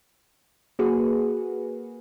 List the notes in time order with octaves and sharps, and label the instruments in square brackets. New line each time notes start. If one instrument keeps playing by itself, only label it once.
[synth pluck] A#3 F#4 G#4 B4